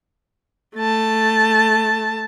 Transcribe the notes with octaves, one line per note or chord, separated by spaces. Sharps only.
A3 A5